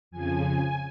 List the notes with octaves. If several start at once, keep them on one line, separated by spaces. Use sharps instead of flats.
F2 C#3 F3 G#5